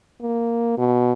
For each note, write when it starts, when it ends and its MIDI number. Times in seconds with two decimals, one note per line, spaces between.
0.21 0.77 58
0.78 1.13 47